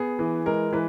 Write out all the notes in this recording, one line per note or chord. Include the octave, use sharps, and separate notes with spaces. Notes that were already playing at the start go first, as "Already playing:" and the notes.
Already playing: B3 G#4
E3
G#3 A#4
E3 B4